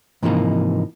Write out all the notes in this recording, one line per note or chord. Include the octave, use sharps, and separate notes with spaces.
G#2 C3 E3 F3 A#3 D#4